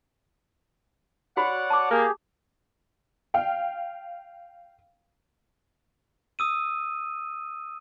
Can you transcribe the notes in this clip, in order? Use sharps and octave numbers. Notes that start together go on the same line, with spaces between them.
F#4 C#5 D5 F#5 B5
A5 D6
A#3 G4 G#4
F5 G5
D#6 E6 D#7